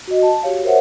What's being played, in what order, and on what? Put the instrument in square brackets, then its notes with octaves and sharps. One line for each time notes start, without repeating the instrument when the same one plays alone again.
[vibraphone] F#4 D#5
A5
F#4 G4 C#5 F5
A#4 C5 C#5 E5 F#5